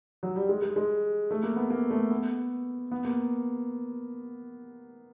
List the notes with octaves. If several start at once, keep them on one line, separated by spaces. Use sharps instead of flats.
F#3
G3
G#3
G#3
G#3
A3
A#3
B3
A#3
A3
B3
B3
A#3